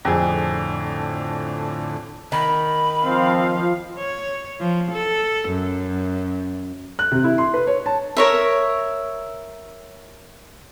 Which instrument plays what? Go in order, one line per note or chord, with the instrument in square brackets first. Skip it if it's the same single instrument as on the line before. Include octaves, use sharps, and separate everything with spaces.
[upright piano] F2 G#4 [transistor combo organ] A2 D3
[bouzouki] D#3 [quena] B5
[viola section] F3 F5 [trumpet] C4
[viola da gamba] C#5
F3
A4
F#2
[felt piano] F#6
C3
E4
C6
B4
C#5
A5
[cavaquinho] A#4 C#5 E5